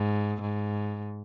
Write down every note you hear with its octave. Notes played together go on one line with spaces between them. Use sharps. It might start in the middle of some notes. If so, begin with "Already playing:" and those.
Already playing: G#2
G#2